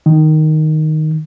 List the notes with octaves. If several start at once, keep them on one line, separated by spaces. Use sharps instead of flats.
D#3